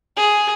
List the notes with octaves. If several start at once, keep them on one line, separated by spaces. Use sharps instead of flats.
G#4